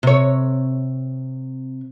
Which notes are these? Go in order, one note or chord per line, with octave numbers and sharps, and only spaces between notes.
C3 C#5